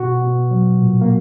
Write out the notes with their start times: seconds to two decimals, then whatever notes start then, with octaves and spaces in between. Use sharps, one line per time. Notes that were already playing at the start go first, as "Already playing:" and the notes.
Already playing: B2 F#4
0.22 B2
0.51 F#3
0.79 A#2
1.01 A#3